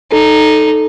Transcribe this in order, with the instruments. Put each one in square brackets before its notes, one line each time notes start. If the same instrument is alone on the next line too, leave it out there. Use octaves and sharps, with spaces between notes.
[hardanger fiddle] D#4 [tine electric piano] A4